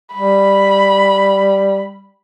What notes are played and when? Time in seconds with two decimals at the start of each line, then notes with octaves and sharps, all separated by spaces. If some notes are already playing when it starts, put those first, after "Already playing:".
0.14 G3 B5